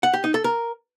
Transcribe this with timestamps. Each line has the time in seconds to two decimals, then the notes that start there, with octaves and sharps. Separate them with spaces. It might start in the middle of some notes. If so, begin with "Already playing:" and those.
0.03 F#5
0.13 G4
0.24 D#4
0.34 A4
0.44 A#4